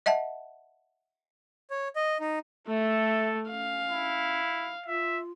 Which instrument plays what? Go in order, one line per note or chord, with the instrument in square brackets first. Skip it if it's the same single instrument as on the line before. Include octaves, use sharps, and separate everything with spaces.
[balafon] D#5 E5 F#5 A5
[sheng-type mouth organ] C#5
D#5
D#4
[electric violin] A3 [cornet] A4 [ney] E5
[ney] C#4 [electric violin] F5
[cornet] E4
[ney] F4 [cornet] E5